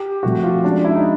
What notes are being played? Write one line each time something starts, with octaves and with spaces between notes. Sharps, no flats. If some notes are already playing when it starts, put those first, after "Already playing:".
Already playing: G4
F3 A3 C4 F#4
F4
G#3 C#4 D4 F#4
E4
D#4